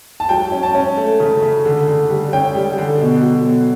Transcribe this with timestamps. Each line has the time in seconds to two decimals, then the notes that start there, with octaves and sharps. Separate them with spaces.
0.20 A5
0.29 F#3 G5
0.52 C#4
0.63 A5
0.75 C#4
0.97 A3
1.20 C#3
1.42 C#3
1.66 D3
1.88 D3
2.10 G3
2.33 C#4 G5
2.55 G3
2.78 D3
3.01 B2
3.23 F#3
3.46 B2